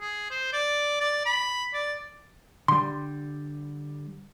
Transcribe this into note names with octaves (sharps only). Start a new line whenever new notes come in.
G#4
C5
D5
D5
B5
D5
D3 G3 C6